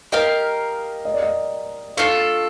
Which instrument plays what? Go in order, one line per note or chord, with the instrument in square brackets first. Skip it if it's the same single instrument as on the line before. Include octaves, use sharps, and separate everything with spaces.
[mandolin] G4 A#4 F5 [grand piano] D#5
[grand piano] D#5
D5
D#5
[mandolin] A3 D4 F4 A4 [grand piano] F5